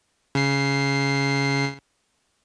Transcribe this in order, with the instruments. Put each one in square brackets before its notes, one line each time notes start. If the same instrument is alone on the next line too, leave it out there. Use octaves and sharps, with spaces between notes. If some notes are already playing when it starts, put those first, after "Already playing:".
[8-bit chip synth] C#3 C7